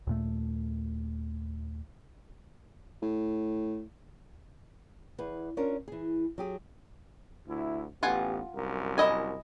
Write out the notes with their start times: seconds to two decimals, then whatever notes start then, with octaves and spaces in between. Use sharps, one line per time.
0.07 D#2 A#2 A3
3.02 A2
5.18 E2 G#4 B4
5.57 C#4 D4 F4 A#4 C#5
5.88 E3 G#4
6.38 F#3 G4 G#4
7.48 D2 E4
8.03 A1 B3 F4 G4 F#5 G#5
8.56 C2 F#2 A#4
8.98 E4 D#5 G#5